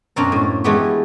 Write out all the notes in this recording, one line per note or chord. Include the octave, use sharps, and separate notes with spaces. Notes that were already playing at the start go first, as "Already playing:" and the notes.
F#2 B2 C4 D4 F5 A#5
A2
E3 G#3 A3 B3 G4 B4